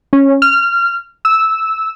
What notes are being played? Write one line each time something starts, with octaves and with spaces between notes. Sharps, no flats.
C#4
F6
E6